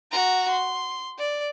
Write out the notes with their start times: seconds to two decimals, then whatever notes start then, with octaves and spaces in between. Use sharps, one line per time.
0.12 F#4 A#5
0.51 C6
1.18 D5